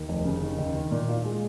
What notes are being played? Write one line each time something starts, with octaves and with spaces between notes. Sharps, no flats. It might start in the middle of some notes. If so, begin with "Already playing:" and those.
Already playing: D#2
F1
C#3
D#3
D#2
D#3
A#2
F4
G#3